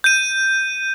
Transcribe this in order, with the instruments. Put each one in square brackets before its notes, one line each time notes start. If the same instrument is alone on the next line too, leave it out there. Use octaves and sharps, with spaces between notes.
[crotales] G6 D#7